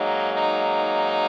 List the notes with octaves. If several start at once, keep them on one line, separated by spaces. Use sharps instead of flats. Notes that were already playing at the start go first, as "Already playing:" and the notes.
Already playing: G#2 F#3 A#3 D#4
D#4